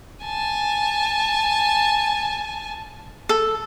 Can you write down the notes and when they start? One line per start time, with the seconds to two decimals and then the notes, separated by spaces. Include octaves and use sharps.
0.24 G#5 A5
3.29 A4